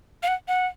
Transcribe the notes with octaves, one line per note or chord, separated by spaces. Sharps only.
F5
F#5
F#5